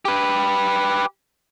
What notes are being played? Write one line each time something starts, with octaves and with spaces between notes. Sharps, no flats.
G4 B4